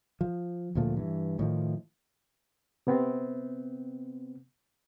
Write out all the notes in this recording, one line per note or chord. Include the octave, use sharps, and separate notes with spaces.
F3
D2 A#2 F3 A3
G2 E3
A2 D#3 F3
C3 B3 C4